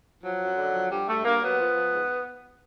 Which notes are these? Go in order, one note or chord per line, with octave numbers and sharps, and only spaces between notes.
F3 F#3
F#2
D3
F3
G2 G3
G2 A3
G2 A#3
F#3 B3
F3
F3
G#2